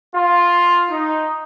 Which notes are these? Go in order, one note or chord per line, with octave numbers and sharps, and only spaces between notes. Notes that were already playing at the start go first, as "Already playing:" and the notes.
F4
D#4